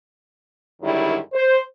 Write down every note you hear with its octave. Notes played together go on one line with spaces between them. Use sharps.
F#2 D3 D#3 G3 G#3 E4
C5